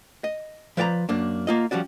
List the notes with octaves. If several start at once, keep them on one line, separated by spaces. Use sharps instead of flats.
D#5
F3 B4 D5 G5 A#5
F#2 A#3 D4
A#3 F4 D#5
F3 G3 C#4 F#4 D5